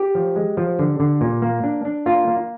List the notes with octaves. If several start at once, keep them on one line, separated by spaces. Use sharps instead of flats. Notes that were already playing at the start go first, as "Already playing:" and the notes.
Already playing: G4
F3
G#3
F3
D3
D3
A#2
A#3
D4
D4
A#3 F4
A#3